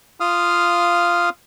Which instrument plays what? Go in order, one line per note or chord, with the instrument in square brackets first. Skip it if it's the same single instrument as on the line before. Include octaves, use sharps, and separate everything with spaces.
[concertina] F4 F5 D#6 F6